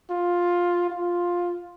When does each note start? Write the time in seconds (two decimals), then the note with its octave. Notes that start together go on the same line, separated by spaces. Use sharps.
0.10 F4
0.90 F4